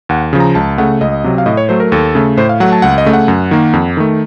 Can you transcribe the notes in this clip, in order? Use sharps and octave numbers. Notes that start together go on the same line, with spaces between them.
D#2 F#5
C#3 F3
A#5
C#2 A5
C#3 A3 F#5
C#2 D#5
C3 F#3
F5
A2 D#5
C#5
F#3 A3 C5
A#4
D#2 A4
C#3 A3
A2 C5
F5
F#3 A3 F#5
A5
C#2 F#5
D#5
C#3 A3
F#5
F#2
D#3 A#3
F2
D#3 A3